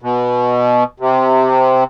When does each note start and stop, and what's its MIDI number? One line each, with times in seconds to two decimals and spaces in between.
0.02 0.84 47
1.00 1.84 48